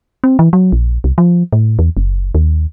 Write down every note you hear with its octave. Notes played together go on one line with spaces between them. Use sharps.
C4
E3
F#3
A#1
C2
F3
A2
E2
F#1
D#2